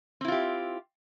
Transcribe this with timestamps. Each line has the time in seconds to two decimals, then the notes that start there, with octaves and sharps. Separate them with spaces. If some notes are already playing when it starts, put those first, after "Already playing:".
0.21 C4
0.25 E4
0.28 F4
0.32 G4